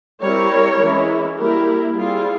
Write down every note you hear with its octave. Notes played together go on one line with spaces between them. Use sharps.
G3 C4 E4 A#4 C#5
E3 G#3 C#4 E4
G3 A#3 E4 G4 A#4
G3 C4 E4 F4 G#4